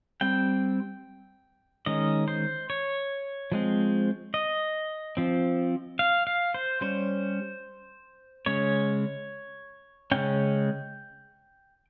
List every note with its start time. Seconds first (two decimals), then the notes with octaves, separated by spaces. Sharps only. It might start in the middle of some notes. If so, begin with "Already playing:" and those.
0.21 G3 C4 G5
1.86 D#3 G#3 C#4 D#5
2.28 C5
2.70 C#5
3.52 F3 G#3 C4
4.34 D#5
5.17 F3 C4
5.99 F5
6.27 F5
6.54 C5
6.81 G3 C#4 C5
8.46 C#3 G#3 C#4 C#5
10.11 C#3 G#3 C#4 G5